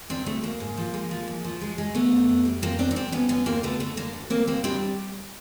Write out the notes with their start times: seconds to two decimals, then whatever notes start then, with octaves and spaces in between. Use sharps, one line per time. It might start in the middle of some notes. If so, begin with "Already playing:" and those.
0.10 D2 C4 D4
0.26 D2 A3
0.43 D2 A#3
0.60 G#2
0.77 F3
0.94 G#3
1.11 F3
1.28 G#2
1.44 F3
1.61 G#3
1.78 G#3
1.95 D3 A3 B3
2.12 F2
2.29 F2
2.45 G3
2.62 F2 A#3 C4
2.79 F2 C4 D4
2.91 D#4
2.96 F2 C4 D4
3.12 F2 B3 C#4
3.29 D3 B3 C#4
3.46 D2 A#3 C4
3.63 D3 A3 B3
3.80 D3 A3
3.97 D3 A#3
4.13 D2
4.30 D2 A#3 C4
4.47 D2 A#3 C4
4.64 G3 C4 D4